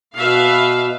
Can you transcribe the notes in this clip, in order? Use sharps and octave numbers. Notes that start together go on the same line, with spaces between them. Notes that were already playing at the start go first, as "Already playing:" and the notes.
B2 B4 E5 F5